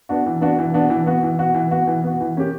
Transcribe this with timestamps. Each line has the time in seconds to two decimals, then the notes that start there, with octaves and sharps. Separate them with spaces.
0.09 B3 D4 F#4
0.26 E3
0.41 B3 D4 F#4
0.59 E3
0.74 B3 D4 F#4
0.90 E3
1.06 B3 F#4
1.23 E3
1.39 B3 F#4
1.55 E3
1.71 B3 F#4
1.87 E3
2.04 B3 F#4
2.21 E3
2.37 A#3 C#4 G4